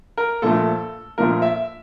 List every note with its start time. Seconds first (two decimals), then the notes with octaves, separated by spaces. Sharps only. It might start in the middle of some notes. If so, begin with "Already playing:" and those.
0.17 A#4
0.42 A#1 A#2 F3 A3 A4
1.18 A#1 A#2 F3 A3 A#4
1.42 E5